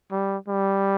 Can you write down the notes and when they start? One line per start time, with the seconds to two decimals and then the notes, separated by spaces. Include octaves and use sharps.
0.11 G3
0.48 G3